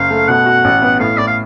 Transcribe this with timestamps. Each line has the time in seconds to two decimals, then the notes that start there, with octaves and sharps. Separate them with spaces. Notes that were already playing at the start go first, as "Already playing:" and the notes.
Already playing: F#1 F5
0.10 A3
0.29 B2 F#5
0.46 F#4
0.64 A1
0.82 B3
1.00 A2 F5
1.18 A2 D5
1.27 F5